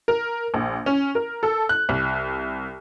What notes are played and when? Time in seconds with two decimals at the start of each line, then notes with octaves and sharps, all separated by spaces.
0.08 A#4
0.54 A#1
0.86 C#4
1.15 A#4
1.43 A4
1.69 F#6
1.89 C2